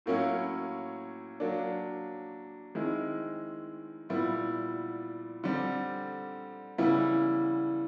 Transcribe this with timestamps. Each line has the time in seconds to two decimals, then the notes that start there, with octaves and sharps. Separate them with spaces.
0.06 A2 F#3 A#3 C#4 E4
1.40 F#3 A#3 D4
2.75 D#3 G#3 C4 E4
4.09 A#2 G3 B3 E4
5.44 D3 G3 C4
6.78 C#3 E3 G3 B3 E4